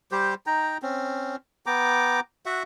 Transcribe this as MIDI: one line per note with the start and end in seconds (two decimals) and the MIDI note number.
0.12 0.34 55
0.12 0.34 67
0.12 0.34 72
0.47 0.78 63
0.47 0.78 79
0.47 0.78 82
0.82 1.36 60
0.82 1.36 61
1.66 2.20 59
1.66 2.20 79
1.66 2.20 82
1.66 2.20 86
2.46 2.63 66
2.46 2.63 76
2.46 2.63 78